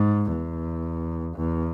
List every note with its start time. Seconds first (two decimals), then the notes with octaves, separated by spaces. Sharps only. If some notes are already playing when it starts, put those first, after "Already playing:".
Already playing: G#2
0.32 E2
1.36 E2